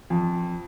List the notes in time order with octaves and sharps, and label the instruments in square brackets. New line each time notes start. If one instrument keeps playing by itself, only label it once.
[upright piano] F2